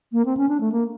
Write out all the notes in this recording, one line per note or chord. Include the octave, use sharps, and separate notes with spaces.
A#3
C4
C#4
D4
A3
A#3